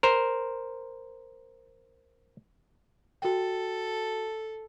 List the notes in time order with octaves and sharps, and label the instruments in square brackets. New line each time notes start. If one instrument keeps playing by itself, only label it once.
[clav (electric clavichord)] A#4 C5
[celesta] F#4 G5 [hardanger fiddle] A4